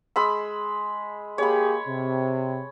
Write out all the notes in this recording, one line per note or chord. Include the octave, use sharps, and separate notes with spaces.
G#3 B5 E6
A#3 G4 G#4 C#5 B5
C3